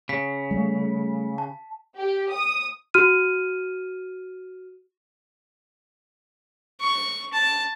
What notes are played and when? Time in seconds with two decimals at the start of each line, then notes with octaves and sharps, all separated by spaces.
0.09 C#3 B6
0.51 G3 A3
1.38 A5
1.97 G4
2.33 D#6
2.94 F#4 F6 D#7
6.80 C#6
7.33 A5